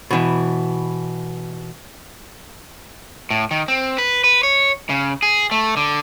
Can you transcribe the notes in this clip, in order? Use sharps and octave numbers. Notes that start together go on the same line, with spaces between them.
B2 E3
A2
D#3
C4
B4
B4
C#5
C#3
G#4
A3
D3